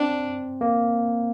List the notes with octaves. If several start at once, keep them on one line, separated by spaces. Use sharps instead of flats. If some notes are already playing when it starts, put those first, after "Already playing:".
Already playing: C4 D4
A#3